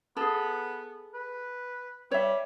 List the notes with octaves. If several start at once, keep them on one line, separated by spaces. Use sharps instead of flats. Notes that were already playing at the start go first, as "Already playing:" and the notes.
B3 G#4 A4
B4
G3 C#5 E5